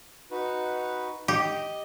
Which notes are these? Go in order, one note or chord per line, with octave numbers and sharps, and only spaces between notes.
D#4 F#4 B4
G4 D#5